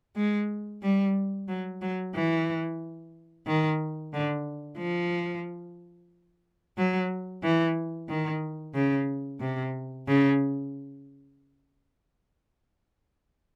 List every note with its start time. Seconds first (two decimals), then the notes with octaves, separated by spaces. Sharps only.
0.16 G#3
0.82 G3
1.49 F#3
1.82 F#3
2.15 E3
3.47 D#3
4.13 D3
4.78 F3
6.77 F#3
7.43 E3
8.09 D#3
8.74 C#3
9.41 C3
10.07 C#3